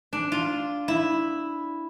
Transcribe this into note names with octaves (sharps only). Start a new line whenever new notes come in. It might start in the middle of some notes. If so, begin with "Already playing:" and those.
D4
F4
E4